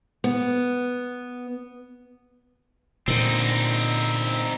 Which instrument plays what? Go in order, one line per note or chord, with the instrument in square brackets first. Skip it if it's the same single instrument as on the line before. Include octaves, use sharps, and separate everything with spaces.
[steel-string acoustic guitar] B3
[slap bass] A#2 D3 [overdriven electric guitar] C4 D#4